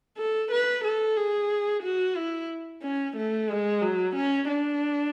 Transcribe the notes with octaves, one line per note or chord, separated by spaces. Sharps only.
A4
B4
A4
G#4
F#4
E4
C#4
A3
G#3
F#3
C#4
D4